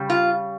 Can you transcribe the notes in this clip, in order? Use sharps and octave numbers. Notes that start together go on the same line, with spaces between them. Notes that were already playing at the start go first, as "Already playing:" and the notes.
Already playing: C#3 G3
F4